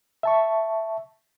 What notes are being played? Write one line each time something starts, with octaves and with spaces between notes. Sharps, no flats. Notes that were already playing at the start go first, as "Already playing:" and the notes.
E5 A5 C#6